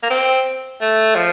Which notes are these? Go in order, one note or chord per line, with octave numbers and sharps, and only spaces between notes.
A#3
C4
A3
F3